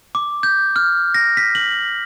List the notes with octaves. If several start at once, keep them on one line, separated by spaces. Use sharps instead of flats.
D6
G6
F6
A#6
B6
F#7